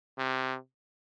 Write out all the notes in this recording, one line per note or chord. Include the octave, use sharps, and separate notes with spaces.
C3